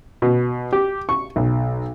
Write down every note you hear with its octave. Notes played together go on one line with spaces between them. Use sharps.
B2
G4
C#6
B1